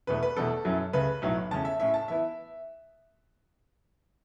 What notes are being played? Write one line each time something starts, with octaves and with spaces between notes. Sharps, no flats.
E1 E2 B2 A3 B4
B4
E1 E2 B2 A3 A4
F#2 F#3 C#4 E4
C#2 C#3 A3 B4
B1 A2 F#3 A3
E2 C#3 A3 C#4 A5
E5
A2 A3 C#4 E4 E5
A5
E3 B3 E4 E5